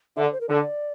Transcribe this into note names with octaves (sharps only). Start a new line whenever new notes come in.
D3 E5
D5
C5
A#4
D3 D5